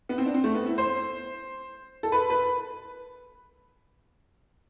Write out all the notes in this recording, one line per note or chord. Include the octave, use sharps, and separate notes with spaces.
B3
C4
D4
C4
A3
B3
E4
C5
A4
B4
B4